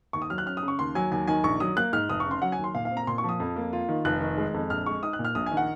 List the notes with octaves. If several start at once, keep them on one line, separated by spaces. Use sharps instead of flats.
D#2 C#6
D#6
F#3 F6
F#6
C#4 F6
D#6
C#3
C#6
D#2 C6
F#3 G#5
D#2 G#5
D#3 G#5
A#1 C#6
F#3 D#6
A#3 F#6
G#2 F6
F1 D#6
C#6
C#3
C6
F#3 F#5
G#5
D#2
C6
A#2 F5
F5
C4
A#5
A#2 C6
C#6
F3
D#6
F2
A#3
F4
D#3
F1 F#6
D#3
G#3
F2
A#1 F6
G#3 C#6
D#4 D#6
F#6
A#2
F6
A#1 D#6
G#5
D#3
F#5